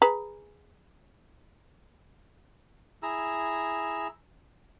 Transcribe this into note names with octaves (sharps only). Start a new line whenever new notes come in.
G#4 B4 A#5
E4 G#4 A#5 E6